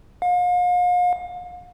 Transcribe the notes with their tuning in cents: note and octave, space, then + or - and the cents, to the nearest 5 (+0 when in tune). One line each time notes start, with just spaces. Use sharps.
F5 +40